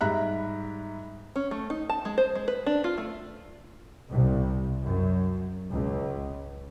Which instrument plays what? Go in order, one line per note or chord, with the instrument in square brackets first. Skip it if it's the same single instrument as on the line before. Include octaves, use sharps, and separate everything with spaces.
[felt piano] G#2 G3 E5 A#5 B5 F#6
[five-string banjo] C#4
A3
D#4
A5
G#3
C5
G#3
B4
D4
F4
A3
[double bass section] C2
F#2
C#2